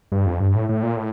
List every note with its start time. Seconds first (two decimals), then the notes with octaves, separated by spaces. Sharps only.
0.12 G2
0.26 F2
0.40 G2
0.55 A2
0.69 A2
0.83 A#2
0.97 A2